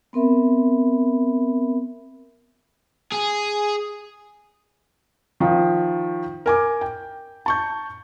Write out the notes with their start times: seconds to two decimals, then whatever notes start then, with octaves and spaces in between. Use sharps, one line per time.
0.13 B3 C4 A#4 E5 B5
3.12 G#4
5.40 D#3 F3
6.46 A#4 G#5 D6
6.81 G5
7.46 A5 C#6 G6